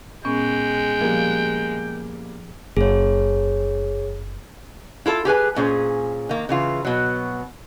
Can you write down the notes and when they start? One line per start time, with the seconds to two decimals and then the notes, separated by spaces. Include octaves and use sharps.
0.25 A#2 G#3 B3 C#4 G5
1.01 F3 G3 A#3
2.77 F#1 G#4 C#5
5.06 E4 F4 A4
5.25 G4 G#4 B4 G#5
5.56 A#2 C#4 G#4 C5
6.29 D#3 A#3
6.49 C#3 E3 F4
6.85 B2 F#3